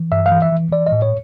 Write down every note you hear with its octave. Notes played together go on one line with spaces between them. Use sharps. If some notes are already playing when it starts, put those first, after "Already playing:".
Already playing: E3
G2 E5
F5
E3
E5
E3
E3 D5
D#5
A2
C#5